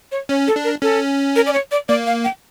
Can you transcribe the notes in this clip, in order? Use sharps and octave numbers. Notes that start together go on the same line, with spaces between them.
C#5
C#4 C#5
A4
D4
A#4
C#4 A4
A#4
D5
C#5
D5
A#3 D5
F5
G5